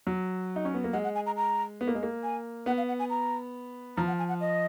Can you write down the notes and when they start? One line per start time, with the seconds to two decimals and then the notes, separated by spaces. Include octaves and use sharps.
0.07 F#3
0.56 D#4
0.65 C#4
0.74 B3
0.84 A#3
0.93 G#3 F#5
1.04 F#5
1.15 G#5
1.26 A#5
1.37 A#5
1.81 B3
1.88 A#3
1.95 G#3
2.03 A#3
2.23 G#5
2.66 B3 F#5
2.77 F5
2.88 F#5
2.99 G#5
3.10 A#5
3.97 F3 A#5
4.07 F#5
4.19 G#5
4.29 F#5
4.40 D#5